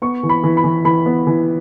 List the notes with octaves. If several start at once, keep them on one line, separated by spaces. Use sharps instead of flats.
B3 C#6
E3
B5
E3
B5
E3
E3 B5
B3
E3